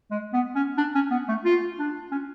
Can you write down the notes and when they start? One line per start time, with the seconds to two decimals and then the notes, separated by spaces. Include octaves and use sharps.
0.11 G#3
0.33 B3
0.55 C#4
0.77 D4
0.95 C#4
1.11 B3
1.28 A3
1.45 F4
1.79 D4
2.12 C#4